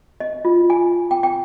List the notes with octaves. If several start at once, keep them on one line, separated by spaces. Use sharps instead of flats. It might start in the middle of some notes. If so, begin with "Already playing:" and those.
D#5
F4
G#5
G5
G5